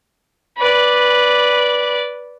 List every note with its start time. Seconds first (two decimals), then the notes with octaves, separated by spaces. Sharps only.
0.57 B4 D5